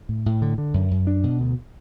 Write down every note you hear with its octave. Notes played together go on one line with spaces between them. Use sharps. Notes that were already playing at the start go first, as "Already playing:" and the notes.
A2
A2
D3
D3
F#2
F#2
D4
B2
D2